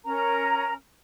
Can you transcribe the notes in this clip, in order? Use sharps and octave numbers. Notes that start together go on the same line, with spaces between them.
C#4 A#4 A#5